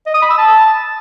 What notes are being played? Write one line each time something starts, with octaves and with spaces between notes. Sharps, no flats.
D#5
D#6
B5
E6
A5